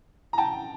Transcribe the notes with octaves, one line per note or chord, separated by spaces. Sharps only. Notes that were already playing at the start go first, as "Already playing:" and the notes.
A#5
G5 A5